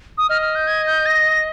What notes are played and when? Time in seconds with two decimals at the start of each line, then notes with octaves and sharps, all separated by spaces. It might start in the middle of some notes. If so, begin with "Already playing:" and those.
0.18 D#6
0.29 D#5 F6
0.42 F6
0.55 G6
0.67 G#6
0.87 G6
1.06 A#6